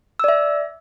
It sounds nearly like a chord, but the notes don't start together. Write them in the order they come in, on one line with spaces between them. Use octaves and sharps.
E6 D5 E5